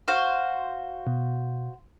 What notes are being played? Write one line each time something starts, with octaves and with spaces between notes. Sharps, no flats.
F#4 C5 F5
B2